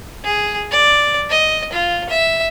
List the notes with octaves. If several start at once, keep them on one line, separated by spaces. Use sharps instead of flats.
G#4
D5
D#5
F4
E5